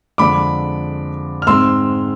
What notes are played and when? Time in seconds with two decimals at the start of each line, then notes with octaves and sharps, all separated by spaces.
0.18 F2 D3 G#3 B5 D6
1.42 F6
1.47 G#2 G#3 C4 C6 E6